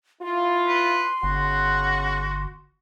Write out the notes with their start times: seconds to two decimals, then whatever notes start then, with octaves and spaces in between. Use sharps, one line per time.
0.22 E4 F4 C6
0.68 B4
1.23 G1 C#3 C#4 F#4 F#5